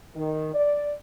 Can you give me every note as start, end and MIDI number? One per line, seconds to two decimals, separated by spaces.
0.15 0.52 51
0.53 0.92 74